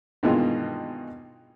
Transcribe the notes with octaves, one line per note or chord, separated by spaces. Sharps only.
G2 B2 D#3 E3 G#3 F4